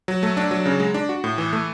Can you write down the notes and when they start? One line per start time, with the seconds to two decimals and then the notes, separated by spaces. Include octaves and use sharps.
0.08 F#3
0.23 A3
0.37 D4
0.51 F#3
0.66 C#3
0.80 G#3
0.94 D4
1.09 F#4
1.24 A2
1.38 E3
1.53 A3